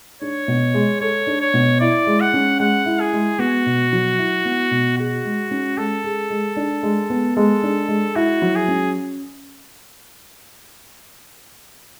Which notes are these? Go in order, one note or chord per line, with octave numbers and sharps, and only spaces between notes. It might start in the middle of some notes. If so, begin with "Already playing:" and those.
D4 C#5
B2
G#3
A4 C#5
D4
C#5
B2
E4 D5
G#3
F#5
C#4
G#3 F#5
E4
G#4
G#3
B3 F#4
B2
F#3
E4
B3
B2
F#4 G#4
G#3
C#4
G#3 A4
G#4
G#3
D4
G#3
B3
G#3 A4
D4
G#3
E4 F#4
F#3
G#4
C#4